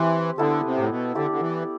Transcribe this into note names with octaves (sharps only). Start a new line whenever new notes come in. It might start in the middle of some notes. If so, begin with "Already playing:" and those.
Already playing: E3 C4 G4
D3 B3 E4 A4
C3
A2
B2
D3 E4 G4 D5
D3
E3